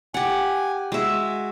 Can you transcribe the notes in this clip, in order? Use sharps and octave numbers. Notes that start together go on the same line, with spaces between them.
G4 F#5 G#5
G#3 F#4 E5